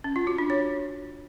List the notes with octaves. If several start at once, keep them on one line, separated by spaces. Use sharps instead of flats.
C#4
F4
F#4
D4
C#5